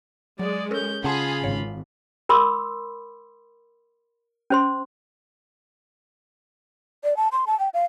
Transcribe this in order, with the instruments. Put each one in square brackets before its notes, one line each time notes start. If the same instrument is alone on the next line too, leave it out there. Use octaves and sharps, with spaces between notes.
[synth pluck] F#3 [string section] G#3 [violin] D5
[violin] C#4 G6 [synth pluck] A4 A#4
[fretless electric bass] C#3 [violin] F4 B5 [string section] G#4 [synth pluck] F#5 A5 C6
[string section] G#1 [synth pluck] C#5 F5
[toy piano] A#4 B5 C6 D6 E6
C#4 C5 C6
[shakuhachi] D5
A5
C6
A5
G5
F5